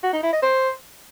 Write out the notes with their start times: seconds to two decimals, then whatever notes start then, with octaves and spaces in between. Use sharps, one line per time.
0.03 F#4
0.13 D#4
0.23 E4
0.33 D#5
0.43 C5